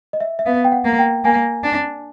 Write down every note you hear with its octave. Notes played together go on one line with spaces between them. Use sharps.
D#5
E5
E5
B3 F5
G5
F#5
A#3
G5
A#3 G#5
D4